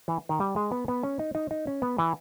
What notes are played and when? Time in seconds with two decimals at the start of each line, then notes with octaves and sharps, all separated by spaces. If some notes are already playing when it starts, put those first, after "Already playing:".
0.08 E3
0.29 D#3
0.40 G3
0.56 G#3
0.72 B3
0.88 B3
1.03 C#4
1.19 D#4
1.35 D#4
1.51 D#4
1.67 C#4
1.82 B3
1.98 E3